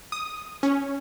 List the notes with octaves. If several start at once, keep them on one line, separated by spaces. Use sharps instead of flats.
D#6
C#4